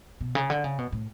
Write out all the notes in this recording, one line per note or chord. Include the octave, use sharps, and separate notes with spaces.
B2
C#3
D3
C#3
B2
A2